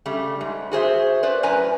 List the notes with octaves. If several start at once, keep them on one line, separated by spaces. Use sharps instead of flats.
C#3 G3 A3
G#2
F#4 G#4 C5 E5
B4 C5 D5
F#2 A2 B4 G#5 A#5